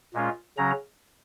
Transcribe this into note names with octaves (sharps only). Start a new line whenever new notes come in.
A#2 G#3 C#4 F4
C#3 F#3 C#4 A#5